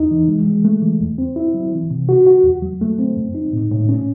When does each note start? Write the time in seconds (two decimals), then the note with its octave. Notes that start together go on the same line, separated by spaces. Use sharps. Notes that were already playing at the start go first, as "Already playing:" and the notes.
Already playing: E2 D#4
0.11 E3
0.28 G#3
0.46 G#3
0.65 A3
0.82 E3
1.01 E2
1.18 C4
1.36 E4
1.54 F#3
1.73 E3
1.91 C3
2.09 F#4
2.27 F#4
2.44 E2
2.62 F#3
2.81 A3
2.99 C4
3.17 F#2
3.35 D#4
3.53 A2
3.71 A2
3.89 C#4